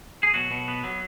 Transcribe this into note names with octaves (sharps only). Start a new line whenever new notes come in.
G#4
B2 F#3 F#4
B2
B3
F#3